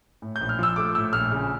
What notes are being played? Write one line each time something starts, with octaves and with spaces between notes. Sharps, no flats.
A2
G6
A#1
F6
F3 E6
A3 D6
A2 E6
A#1 F6
C#3